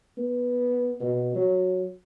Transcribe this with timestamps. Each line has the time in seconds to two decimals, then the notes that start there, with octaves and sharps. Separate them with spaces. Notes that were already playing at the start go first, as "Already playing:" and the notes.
0.17 B3
1.00 B2
1.35 F#3